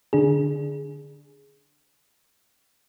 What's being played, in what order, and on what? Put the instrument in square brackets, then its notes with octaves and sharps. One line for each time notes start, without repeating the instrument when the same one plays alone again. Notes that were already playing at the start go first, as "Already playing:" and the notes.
[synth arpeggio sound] D3 D4 G#4